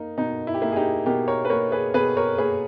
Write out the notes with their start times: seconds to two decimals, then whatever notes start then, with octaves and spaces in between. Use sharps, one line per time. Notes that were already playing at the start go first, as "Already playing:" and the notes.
Already playing: A#3 D#4
0.18 B2 D#4
0.47 E4
0.54 G4
0.62 A#3 E4
0.72 G#4
0.76 D#4 G4
1.06 B2 G4 A#4
1.28 A#4 C#5
1.45 B4
1.50 A#3 A#4 C#5
1.72 G#4 B4
1.94 B2 G#4 B4
2.17 A#4 C#5
2.38 A#3 G#4 B4